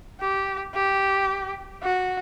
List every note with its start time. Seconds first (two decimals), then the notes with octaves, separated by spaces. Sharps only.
0.20 G4
0.74 G4
1.83 F#4